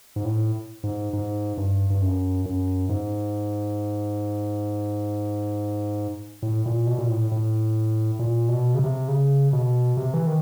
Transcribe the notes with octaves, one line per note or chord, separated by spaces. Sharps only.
G#2
A2
G#2
G#2
G2
G2
F#2
F#2
G#2
A2
A#2
B2
A#2
A2
A2
A#2
B2
C#3
C3
C#3
B2
C3
E3
D#3